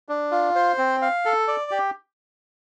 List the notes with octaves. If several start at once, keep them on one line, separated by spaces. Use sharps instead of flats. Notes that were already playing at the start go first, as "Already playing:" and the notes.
D4
F4
C5
C4
F5
A4
D5
G4